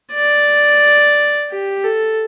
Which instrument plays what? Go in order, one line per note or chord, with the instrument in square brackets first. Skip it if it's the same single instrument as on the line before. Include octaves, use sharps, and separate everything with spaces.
[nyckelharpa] D5
G4
A4